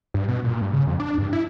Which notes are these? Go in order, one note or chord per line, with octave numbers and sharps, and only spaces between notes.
G2
B2
A#2
G2
C#3
F2
D4
G2
E4